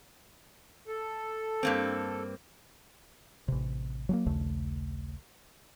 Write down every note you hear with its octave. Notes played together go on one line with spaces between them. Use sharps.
A4
G2 A#3 C4
A1 C3
F#3 G#3 A#3
A#1 D#2 C#3 A3